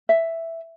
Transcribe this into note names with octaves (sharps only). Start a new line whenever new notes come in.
E5